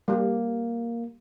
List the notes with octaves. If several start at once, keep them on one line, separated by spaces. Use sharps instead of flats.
G3 A#3 G4